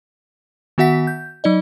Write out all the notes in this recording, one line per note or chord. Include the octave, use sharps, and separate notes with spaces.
D#3 B3 F#4 E5 F#5 B6
G6
F#3 D#4 D5 D#5